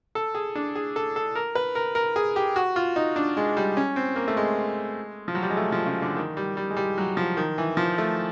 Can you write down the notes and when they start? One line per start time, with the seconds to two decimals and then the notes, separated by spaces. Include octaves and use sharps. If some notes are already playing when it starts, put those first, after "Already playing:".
0.15 A4
0.35 G#4
0.55 D4
0.75 G#4
0.96 A4
1.16 A4
1.35 A#4
1.55 B4
1.75 A#4
1.95 A#4
2.16 G#4
2.36 G4
2.56 F#4
2.76 F4
2.96 D#4
3.16 D4
3.37 G#3
3.57 G3
3.77 C#4
3.96 C4
4.16 A#3
4.28 A3
4.37 G#3
5.28 F3
5.35 F#3
5.42 G3
5.50 G#3
5.57 A3
5.72 F3
5.86 C#3
6.02 D3
6.16 D#3
6.37 G3
6.57 G3
6.70 G#3
6.77 G3
6.98 F#3
7.17 F3
7.37 D#3
7.58 E3
7.77 F3
7.98 A3